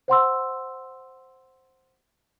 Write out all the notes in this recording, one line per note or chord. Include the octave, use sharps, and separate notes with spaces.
C5 F#5 C6 E6